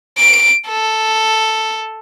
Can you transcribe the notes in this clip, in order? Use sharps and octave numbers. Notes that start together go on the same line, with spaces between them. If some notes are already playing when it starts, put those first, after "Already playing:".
D7
A4